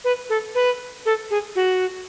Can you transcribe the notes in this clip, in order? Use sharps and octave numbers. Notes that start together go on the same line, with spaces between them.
B4
A4
B4
A4
G#4
F#4